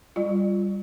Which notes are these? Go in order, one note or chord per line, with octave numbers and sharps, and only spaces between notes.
G3 F4